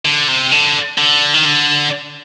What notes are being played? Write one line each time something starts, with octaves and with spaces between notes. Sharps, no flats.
D3
C3
D3
D3
D#3
D3